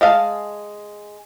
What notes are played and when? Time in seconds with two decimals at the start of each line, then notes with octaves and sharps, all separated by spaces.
0.01 G#3 D#5 F5 A5